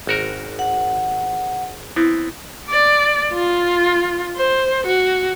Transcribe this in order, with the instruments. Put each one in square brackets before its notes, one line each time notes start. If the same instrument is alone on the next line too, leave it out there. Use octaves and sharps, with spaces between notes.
[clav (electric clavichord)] G#1 F#4 A#4
[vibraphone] F#5
[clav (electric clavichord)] B3 C4 [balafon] E4
[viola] D5
F4
C5
F#4